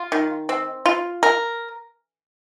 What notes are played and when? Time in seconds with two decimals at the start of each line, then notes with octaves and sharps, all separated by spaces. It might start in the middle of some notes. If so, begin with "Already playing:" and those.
Already playing: F4
0.12 D#3
0.49 C4
0.86 F4
1.23 A#4